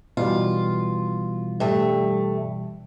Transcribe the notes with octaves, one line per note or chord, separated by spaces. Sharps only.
B2 E3 G3 F4
G2 A3